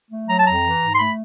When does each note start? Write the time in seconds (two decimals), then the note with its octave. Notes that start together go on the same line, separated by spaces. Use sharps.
0.10 A3
0.27 F#3 A#5
0.37 A5
0.45 F2 A#5
0.62 E3
0.80 G#2
0.93 C6
0.98 A3 B5